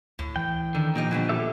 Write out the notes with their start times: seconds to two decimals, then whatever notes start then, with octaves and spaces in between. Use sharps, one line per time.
0.19 D2 A2
0.36 E3 G5
0.75 D3 D#3
0.95 A#2 F3 D#4 G4 D#5
1.11 B2 D3 G3
1.29 G4 A4 E5